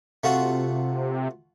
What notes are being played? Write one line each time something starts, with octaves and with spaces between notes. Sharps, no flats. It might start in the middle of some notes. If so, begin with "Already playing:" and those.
C3 A3 F4 F#4